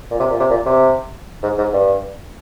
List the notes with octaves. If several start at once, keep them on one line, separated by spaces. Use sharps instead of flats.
A#2
C3
A#2
C3
A#2
C3
G#2
G#2
G2